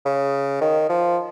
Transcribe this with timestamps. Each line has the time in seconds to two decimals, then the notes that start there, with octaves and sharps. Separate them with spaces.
0.05 C#3
0.61 D#3
0.89 F3